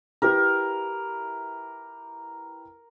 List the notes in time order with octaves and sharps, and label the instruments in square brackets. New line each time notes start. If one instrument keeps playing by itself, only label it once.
[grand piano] E4 G4 B4 [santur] A#4